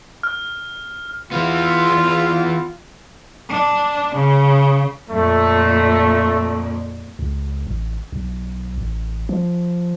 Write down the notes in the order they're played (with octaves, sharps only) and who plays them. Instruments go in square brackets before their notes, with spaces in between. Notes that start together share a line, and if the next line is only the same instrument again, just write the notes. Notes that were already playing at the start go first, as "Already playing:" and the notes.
[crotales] F6
[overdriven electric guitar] E3 B3 [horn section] F4
[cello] D4
C#3
[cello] F2 A#2 [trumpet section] A3
[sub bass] C#2
A1
B1
A1
F3